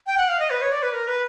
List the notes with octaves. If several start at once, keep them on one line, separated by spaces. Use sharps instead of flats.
G5
F#5
F5
D#5
B4
C#5
D5
B4
A#4
B4